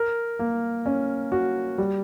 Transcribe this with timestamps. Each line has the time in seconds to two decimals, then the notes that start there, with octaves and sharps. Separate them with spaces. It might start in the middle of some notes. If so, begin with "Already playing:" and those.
Already playing: A#4
0.39 A#3
0.86 C#4
1.32 F#4
1.78 G3